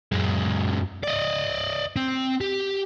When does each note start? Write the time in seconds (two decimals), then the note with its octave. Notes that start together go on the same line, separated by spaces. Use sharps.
0.12 F#2 G#3
1.03 D5 D#5
1.96 C4
2.41 G4